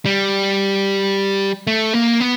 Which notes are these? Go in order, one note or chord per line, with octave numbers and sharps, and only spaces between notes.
G3
A3
A#3
B3